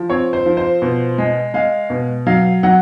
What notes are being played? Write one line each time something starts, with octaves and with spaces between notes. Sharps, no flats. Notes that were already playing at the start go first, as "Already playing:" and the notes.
Already playing: F3
C4 C#5
C5
F3
C5
B2
G#3
G#3 F5
B2
F#3 F5
F#3 F#5